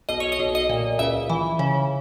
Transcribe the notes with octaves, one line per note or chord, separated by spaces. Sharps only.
B1 D#5
C#5
D#5
B1
D#5
A#2
C#2 E5
E3
C#3